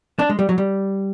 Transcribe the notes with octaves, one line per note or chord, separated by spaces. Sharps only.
D4
G#3
G3
F#3
G3